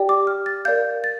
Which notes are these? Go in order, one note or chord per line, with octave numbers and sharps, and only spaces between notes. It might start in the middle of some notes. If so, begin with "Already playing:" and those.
Already playing: G4 D5 G5
D6
F6
A6
A#4 D5 F5 G6
A6